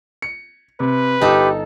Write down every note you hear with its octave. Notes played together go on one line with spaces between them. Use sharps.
C#7
C3 B4
G1 D#4 G4 A4